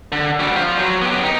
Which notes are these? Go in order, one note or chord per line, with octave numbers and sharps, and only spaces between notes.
D3
G3 F#4
F4 C5
F#3
B3 G4
D#4